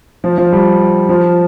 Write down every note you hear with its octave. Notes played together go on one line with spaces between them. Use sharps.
F3
F3
G3
F3